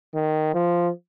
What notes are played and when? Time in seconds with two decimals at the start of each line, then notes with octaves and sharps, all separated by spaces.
0.15 D#3
0.54 F3